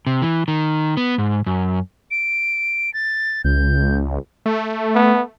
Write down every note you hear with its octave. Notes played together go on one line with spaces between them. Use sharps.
C3
E3
D#3
B3
G#2
F#2
D7
A6
C#2 G6
A3
B3